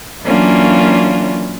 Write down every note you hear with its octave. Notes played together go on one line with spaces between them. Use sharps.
E3 F#3 A#3 C#4 D4 F4